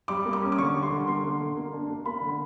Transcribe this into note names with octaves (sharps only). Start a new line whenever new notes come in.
G3 D6
A#3
D6
C#4
D6
D3 C#6
G3
C6
D3
A#3 C6
D3
D3
A#3
D4
A#3
A#3 B5
D3